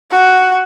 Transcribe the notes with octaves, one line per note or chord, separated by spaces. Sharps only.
F#4